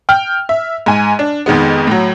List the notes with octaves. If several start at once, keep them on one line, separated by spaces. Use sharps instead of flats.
G5 F6
E5
G#2 G#5
D4
F2 D#3 G#3 B3
A2 F#3